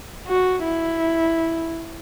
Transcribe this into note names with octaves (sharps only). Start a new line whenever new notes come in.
F#4
E4